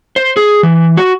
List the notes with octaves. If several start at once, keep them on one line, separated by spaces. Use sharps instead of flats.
C5
G#4
E3
F#4